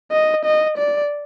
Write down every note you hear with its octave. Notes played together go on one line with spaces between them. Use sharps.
D#5
D#5
D5